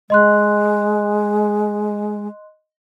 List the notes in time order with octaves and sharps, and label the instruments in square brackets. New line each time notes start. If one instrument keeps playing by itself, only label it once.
[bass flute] G#3 [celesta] D#5 C6 F#6